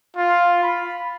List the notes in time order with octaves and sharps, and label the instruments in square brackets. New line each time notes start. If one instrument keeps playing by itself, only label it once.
[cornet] F4
B5